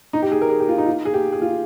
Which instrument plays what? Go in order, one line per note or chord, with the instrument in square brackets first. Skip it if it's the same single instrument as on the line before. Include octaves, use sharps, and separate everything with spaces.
[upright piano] D#4
G4
G#4
A#4
G#4
G4
F4
D#4
F4
G#4
G4
G#4
F4